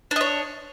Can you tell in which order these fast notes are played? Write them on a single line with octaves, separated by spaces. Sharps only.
D4 D#5 C#5